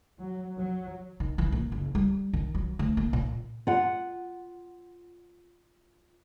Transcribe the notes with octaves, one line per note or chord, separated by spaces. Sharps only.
F#3
F#3
D#3
E3
A#2
F#1
G3
D#3
F#3
D2
A#3
A#2
F4 F#5